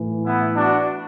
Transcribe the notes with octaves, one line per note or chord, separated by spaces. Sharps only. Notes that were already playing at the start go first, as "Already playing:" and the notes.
Already playing: A2 E3
B3 E4
D4 F#4